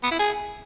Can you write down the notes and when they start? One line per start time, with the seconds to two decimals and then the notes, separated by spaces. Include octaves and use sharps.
0.03 B3
0.11 E4
0.19 G#4